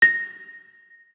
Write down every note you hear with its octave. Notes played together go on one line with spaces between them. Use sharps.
A#6